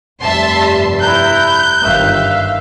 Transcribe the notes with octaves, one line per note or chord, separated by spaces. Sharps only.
F1 G2 G3 E5 A5 C6
E4 A#5 F#6 G6
G1 F#2 D#3 E5 F5